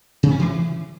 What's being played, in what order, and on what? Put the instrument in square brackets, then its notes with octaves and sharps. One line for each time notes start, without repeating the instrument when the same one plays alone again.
[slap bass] C3
C#4
E3